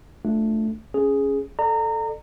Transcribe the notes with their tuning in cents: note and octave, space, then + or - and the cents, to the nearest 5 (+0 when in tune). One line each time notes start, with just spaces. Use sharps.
A3 +0 D4 +0 F4 +0
C#4 +0 G#4 +0
A4 +0 D5 +35 A#5 -25